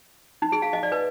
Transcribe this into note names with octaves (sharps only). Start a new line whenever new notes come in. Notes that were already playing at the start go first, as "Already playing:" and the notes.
D#4
G#4
F5
D#5
D5
B4